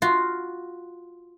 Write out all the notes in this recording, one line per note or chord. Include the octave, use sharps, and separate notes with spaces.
F4 F#4